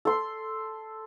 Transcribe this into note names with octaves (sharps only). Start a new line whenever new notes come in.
A4 C6